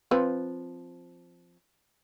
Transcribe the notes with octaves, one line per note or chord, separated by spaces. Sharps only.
F3 C4 B4